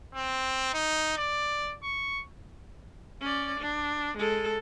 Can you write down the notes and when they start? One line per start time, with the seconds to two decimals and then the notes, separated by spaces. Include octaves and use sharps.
0.15 C4
0.74 D#4
1.18 D5
1.83 C#6
3.21 C#4 D5
3.59 D4
4.17 G#3 A4